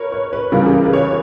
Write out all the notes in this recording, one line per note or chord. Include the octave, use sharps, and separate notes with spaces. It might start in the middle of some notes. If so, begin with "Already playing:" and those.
Already playing: A#4 B4 C#5
C#5
B4
C#2 C#3 E3 G3 A#4
G#4
A#4
B4
C#5